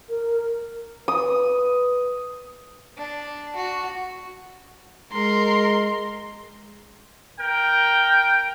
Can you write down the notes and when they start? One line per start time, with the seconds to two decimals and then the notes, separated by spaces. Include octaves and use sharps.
0.09 A#4
1.08 B4 D#6
2.97 D4
3.55 F#4
5.13 G#3 A#4 C6
7.39 A#4 G5